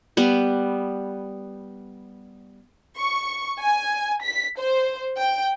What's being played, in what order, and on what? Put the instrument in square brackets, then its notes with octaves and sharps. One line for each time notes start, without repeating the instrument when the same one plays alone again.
[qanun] G3 B3
[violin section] C#6
G#5
B6
C5
G5